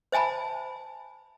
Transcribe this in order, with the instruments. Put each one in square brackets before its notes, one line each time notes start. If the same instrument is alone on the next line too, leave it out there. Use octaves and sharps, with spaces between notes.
[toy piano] C5 E5 G#5 A5 B5